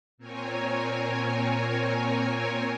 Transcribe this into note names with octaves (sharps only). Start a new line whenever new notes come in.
A#2 C4 A#4 C#5 G#5